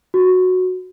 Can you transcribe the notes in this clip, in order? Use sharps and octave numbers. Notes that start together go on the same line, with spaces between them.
F#4